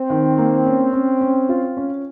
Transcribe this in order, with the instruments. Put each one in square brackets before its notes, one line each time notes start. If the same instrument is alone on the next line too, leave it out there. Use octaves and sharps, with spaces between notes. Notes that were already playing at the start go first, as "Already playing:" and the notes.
Already playing: [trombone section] C4
[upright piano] D#3
A#3
C#4
C#4
C#4
F4
C#4